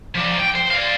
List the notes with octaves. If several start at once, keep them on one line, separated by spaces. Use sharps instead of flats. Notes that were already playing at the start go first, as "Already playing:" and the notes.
F3 D4
G5
C5
D5 F5